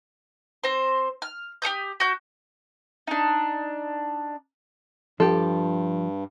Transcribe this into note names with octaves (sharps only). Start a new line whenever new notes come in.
C4 C5
F6
G4 A4 D#6 G6
F#4 G6
D4 D#4
G2 F3 G4 A4